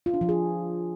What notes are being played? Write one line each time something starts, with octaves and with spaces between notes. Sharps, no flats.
F4
D4
F3
G#4